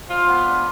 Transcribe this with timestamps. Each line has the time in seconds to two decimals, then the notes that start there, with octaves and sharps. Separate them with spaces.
0.08 F3 F4
0.27 B3
0.44 D4